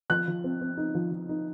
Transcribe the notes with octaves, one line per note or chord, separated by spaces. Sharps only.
F3 F#6
F3
C4
C4
D#4
F3
F3
D#4